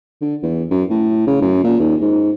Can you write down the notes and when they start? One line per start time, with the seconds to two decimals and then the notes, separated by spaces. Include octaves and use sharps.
0.22 D3
0.43 E2
0.71 F#2
0.90 A2
1.27 C#3
1.41 F#2
1.64 A#2
1.80 D#2
2.02 G#2